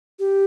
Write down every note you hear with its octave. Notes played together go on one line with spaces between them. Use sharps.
G4